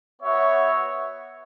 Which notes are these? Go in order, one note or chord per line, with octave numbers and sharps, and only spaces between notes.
B3 F#4 C#5 E5